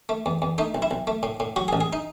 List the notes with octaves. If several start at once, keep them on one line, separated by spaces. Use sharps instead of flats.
A3
E2
E2
A3 D#4
B1
E4
B1
A3
A2
A2
F#3 F#4
G#4
A1
G#4
D#4